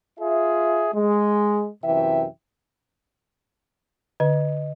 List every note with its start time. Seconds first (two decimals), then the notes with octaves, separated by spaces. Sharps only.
0.19 F4 G#4 E5
0.94 G#3
1.84 F#2 C3 E3 E5 G5
4.20 D3 D#5